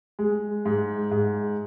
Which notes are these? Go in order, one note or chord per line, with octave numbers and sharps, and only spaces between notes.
G#3
G#2
G#2